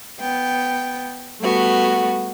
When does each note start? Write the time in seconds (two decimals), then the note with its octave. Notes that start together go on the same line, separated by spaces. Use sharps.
0.20 B3 G5
1.40 G3 A3 B3 F#4